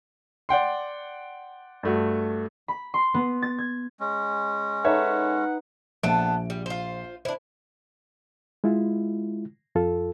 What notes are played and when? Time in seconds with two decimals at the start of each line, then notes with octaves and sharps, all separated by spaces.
0.49 D5 F#5 G5 C6
1.83 G2 A3 F#4
2.68 B5
2.94 C6
3.14 B3
3.42 A6
3.58 G#6
4.00 G#3 C#4
4.84 D#4 A4 B4 C#5 E5 F#5
6.03 A#1 B3 D4 A4 E5 D7
6.50 G3
6.66 F4 C5
7.25 D4 E4 C5
8.64 G#3 E4 F4
9.75 F2 F4 A4